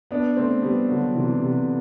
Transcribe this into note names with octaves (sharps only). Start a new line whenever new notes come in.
B3 D4
A3 C4
G3 B3
D3 F#3
C3 E3
C3